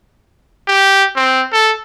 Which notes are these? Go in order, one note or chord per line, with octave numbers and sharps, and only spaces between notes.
G4
C4
A4